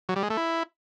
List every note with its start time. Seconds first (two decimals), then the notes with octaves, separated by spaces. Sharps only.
0.09 F#3
0.16 G3
0.23 G#3
0.30 A3
0.37 E4